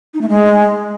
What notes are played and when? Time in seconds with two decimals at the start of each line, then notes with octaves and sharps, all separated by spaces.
0.14 D#4
0.21 A3
0.29 G#3